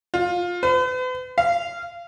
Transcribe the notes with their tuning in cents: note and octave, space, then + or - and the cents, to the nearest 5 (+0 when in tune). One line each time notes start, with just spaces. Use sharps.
F4 +15
B4 +45
F5 -20